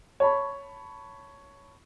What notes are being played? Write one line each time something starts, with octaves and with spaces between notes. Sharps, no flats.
C#5 A5 B5